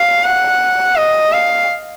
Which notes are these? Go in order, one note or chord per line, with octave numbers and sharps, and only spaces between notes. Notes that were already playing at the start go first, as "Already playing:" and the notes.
Already playing: F5
F#5
D#5
F5